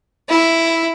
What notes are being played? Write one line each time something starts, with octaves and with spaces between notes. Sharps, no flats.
E4